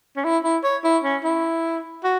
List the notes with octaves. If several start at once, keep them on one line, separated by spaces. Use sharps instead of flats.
C#4
E4
E4
C#5
E4
C#4
E4
F#4